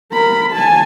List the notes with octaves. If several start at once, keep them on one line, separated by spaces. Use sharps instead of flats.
A#4 B5
G#5 A5